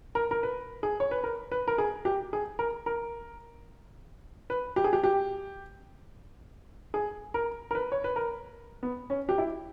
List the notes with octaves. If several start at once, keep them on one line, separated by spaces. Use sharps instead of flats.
A#4
A#4
B4
G#4
C#5
B4
A#4
B4
A#4
G#4
G4
G#4
A#4
A#4
B4
G4
G#4
G4
G4
G#4
A#4
A#4
B4
C#5
B4
A#4
B3
C#4
G4
E4